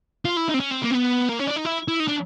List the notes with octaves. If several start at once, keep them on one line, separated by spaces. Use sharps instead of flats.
F4
E4
D#4
C4
C#4
C4
A#3
C4
B3
A#3
C#4
D4
D#4
E4
E4
D#4
D4